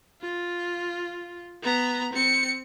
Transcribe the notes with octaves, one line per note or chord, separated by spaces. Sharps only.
F4
B3 A#5
C4 C#7